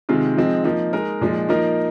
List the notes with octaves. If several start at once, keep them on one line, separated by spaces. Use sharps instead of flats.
C3 D#3 G#3 C4 F4
F3 G#3 C4 D#4
F3 A#3 D#4
G#3 D#4 A#4
A#2 F3 G#3 D#4
F3 A#3 D#4 A#4